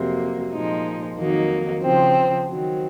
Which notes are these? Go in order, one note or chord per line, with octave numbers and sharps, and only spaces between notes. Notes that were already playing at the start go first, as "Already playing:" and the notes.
Already playing: F2 C3 F#3 A#3
A#2 F3 G#3 D#4
F2 D#3 F#3 A#3 D#4
C#3 F3 C4
D#3 F#3 C4